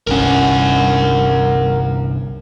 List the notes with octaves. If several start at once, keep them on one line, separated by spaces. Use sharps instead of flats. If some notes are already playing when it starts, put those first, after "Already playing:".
G1 C2 C#4 A#4 F#5